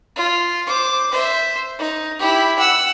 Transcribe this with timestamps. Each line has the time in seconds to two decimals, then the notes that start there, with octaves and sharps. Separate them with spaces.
0.16 F4
0.67 C5 D6
1.11 C5 E5
1.79 D#4
2.19 E4 G4
2.59 F#5 E6